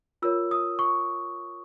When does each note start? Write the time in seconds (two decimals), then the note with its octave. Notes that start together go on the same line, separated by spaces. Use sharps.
0.22 F4 A#4 C#5 E6
0.51 D#6
0.79 C#6